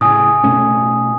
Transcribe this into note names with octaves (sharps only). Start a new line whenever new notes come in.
A2 C#3 G#5 D#6
B2 A3 C#4